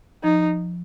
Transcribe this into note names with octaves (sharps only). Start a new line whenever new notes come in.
F3 D#4